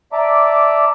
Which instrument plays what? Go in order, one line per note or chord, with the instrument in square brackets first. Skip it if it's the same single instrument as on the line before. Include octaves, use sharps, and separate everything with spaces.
[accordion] D5 E5 A5 A#5 D6